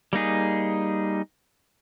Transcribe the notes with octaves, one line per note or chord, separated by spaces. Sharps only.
G3 A#3 D#4 G#4